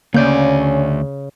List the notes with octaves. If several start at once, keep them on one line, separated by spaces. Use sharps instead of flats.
D2 C#3 A#3 C#4 D5 G6